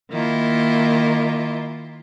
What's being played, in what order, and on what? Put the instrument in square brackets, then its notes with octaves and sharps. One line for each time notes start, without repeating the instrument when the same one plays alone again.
[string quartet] D#3 A#3 E4 F4